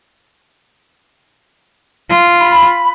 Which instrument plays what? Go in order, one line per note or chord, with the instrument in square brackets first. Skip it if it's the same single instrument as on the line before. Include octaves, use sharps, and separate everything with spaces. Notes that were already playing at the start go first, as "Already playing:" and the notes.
[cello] F4
[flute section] B5